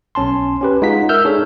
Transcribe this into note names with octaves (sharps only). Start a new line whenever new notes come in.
B1 C#4 A5 C6
C#4 G4 B4
G#3 D#4 F4 F#5 B6
A#4 E5 E6 F6 G6
D4 D#4 G#4 A4 C#5